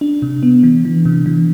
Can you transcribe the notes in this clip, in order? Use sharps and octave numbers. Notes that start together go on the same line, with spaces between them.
D4
C3
B3
E3
E3
C3
E3